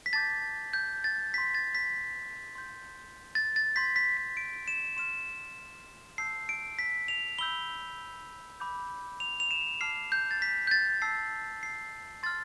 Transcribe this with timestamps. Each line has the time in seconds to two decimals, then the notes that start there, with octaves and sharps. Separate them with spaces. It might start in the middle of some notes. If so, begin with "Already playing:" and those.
0.06 B6
0.13 A5 D6 G6 A6
0.73 G6
1.04 A6
1.34 C6 G6 B6
1.55 A6
1.75 B6
2.55 C6 G6
3.35 A6
3.56 A6
3.76 C6 G6 B6
3.96 B6
4.17 B6
4.37 D7
4.68 E7
4.97 C6 F6 E7
6.18 A5 E6 G6 C7
6.49 D7
6.79 B6
7.08 F7
7.39 B5 E6 G6 G7
8.60 B5 D6 G6
9.20 F7
9.40 F7
9.51 E7
9.81 A5 D6 F6 C7
10.12 G6
10.31 A6
10.42 B6
10.67 G6
10.71 A6
11.02 A5 E6 G6 C7
11.63 C7
12.23 C6 F6 A6